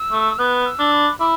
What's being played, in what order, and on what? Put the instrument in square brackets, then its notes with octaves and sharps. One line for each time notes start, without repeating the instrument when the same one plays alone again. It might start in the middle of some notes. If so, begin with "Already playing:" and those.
Already playing: [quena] E6
[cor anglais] A3
[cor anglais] B3 [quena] F#6
[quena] E6
[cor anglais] D4
[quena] B5
[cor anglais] E4 [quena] D6